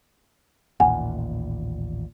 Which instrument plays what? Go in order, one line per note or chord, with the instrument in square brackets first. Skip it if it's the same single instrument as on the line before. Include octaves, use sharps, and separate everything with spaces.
[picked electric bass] A1 D#2 A#2 [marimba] F#5 G#5